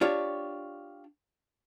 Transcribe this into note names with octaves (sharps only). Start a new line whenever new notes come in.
D4 F4 G4 C#5